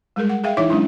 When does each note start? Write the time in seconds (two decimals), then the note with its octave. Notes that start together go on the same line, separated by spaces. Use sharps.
0.16 G3 G#3 G#4 A#4
0.29 F#5
0.44 G#4 E5 F5 G5
0.57 E3 D#4 E4 C#5 E5 D6
0.69 F#3 G#3 C#4 D4 E4